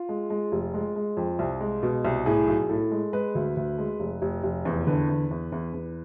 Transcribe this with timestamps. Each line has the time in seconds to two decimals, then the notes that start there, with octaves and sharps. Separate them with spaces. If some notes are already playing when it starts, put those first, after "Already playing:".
Already playing: F4
0.09 G#3
0.30 G#3
0.52 F1
0.74 G#3
0.96 G#3
1.17 F2
1.39 C2
1.60 G#3
1.83 B2
2.05 C2
2.26 A2 G#4
2.47 B1
2.69 A2 A4
2.91 G#3
3.13 G#3 B4
3.35 D2
3.57 D2
3.78 G#3
4.00 F1
4.22 F1
4.44 F1
4.65 E2
4.87 D3 B4
5.09 E2
5.31 E2
5.52 E2
5.74 E2